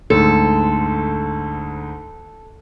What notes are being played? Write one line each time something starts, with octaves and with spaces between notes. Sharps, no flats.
D2 G#2 A4